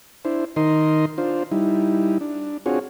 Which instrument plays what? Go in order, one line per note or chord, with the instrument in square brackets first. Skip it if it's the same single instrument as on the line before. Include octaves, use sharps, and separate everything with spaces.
[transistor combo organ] D4 E4 C5
D#3 D#4 A#4 D#5 C6
D4 F4 C5
G3 D#4 E4
D4
C4 D4 F4 F#4 G#4 C#5